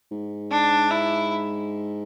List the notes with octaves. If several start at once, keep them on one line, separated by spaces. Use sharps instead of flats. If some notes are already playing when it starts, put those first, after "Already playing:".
G#2
D4
E4